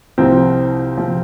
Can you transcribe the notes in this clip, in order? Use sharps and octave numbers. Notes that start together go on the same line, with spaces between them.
C2 C3 F3 C4
C3 F3